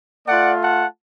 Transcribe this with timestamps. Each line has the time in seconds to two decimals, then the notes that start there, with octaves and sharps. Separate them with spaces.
0.28 A3 F4 D5 F#5
0.61 F#5 A5